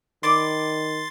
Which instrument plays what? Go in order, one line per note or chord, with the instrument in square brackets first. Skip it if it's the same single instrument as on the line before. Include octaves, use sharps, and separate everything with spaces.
[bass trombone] D#3 [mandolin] D5 B5 D6 [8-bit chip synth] C6 A6